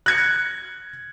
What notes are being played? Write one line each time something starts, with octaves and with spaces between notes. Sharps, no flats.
F#6 G#6 C#7